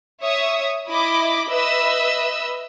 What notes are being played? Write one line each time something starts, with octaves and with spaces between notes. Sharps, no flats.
C#5 E5 C#6 D#6
E4 D#5 B5 D6
B4 D#5 E5 E6